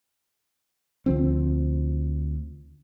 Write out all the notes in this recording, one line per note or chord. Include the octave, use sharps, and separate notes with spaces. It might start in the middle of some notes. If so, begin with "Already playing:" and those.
D2 D3 F3 C4